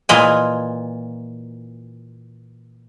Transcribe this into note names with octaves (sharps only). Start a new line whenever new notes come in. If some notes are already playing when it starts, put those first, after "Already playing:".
A#2 E3 F4 D#5 G#5